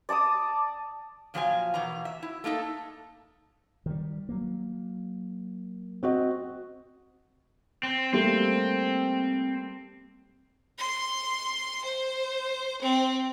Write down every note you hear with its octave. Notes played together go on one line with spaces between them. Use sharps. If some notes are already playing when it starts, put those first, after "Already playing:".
D5 A5 D6 D#6
A#2 F3 F#3 C5 F5 G#5
E2 B2 A#3 A#5
E5
E4
A3 A#3 D#4 A4
D#3 G3
F#3 A#3
C4 F#4 D#5
C4
G3 A3 A#3 C4
C6
C5
C4